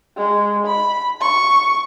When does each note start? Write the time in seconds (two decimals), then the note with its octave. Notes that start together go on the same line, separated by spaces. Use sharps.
0.17 G#3
0.66 B5
1.21 C#6